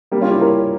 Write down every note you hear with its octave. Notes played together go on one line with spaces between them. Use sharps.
G3 A#3
C#4 F4
E4 G4
A#4 C#5